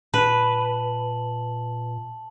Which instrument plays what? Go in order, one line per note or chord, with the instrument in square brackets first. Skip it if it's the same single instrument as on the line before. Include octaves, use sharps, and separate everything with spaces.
[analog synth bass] A#2 [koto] B4 [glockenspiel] A5 F#7